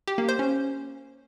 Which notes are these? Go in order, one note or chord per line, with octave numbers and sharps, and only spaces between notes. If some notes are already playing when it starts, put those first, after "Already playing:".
G4
A#3
C5
C#4